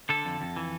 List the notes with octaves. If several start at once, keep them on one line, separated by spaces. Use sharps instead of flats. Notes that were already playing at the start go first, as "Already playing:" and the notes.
D3 A4
F2
F2
E3